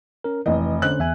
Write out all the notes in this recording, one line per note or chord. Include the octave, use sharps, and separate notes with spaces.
C#4 A#4
F1 E3 D#5
D3 C#4 C5 F#6
E2 E5 G#5